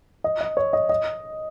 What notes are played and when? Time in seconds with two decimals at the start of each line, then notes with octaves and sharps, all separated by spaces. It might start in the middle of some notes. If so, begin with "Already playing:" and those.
0.24 D#5
0.41 D#5
0.57 C#5
0.73 D#5
0.89 D#5